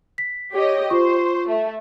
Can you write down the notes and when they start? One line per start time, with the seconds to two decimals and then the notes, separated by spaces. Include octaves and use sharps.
0.18 B6
0.52 G4 C#5 D#5
0.90 F4 C5 C#6
1.47 A3